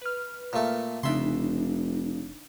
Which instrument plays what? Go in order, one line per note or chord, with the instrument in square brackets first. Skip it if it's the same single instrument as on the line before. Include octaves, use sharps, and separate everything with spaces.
[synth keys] B4 F6
[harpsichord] A#2 A3
[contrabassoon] F1 [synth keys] C#3 D4 D#4 [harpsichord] E5 C6